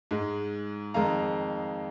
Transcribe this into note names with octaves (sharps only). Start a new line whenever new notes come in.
G#2 G#3
F2 D#3 G#3 F5 A#5